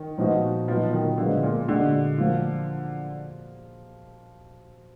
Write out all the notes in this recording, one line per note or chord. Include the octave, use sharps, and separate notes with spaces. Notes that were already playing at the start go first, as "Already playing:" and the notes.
Already playing: D#3
A#2 F3 B3 D#4 F#4
A#2 F3 F#3 B3 D#4
D#3
D3 F3 G#3 B3 F4
A#2
A#2 D3 G#3 D4 F#4
F3 A#3 F4